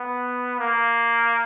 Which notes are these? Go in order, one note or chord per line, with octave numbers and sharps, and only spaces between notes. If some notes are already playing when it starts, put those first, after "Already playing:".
Already playing: B3
A#3